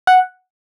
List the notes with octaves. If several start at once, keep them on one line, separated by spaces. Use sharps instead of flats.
F#5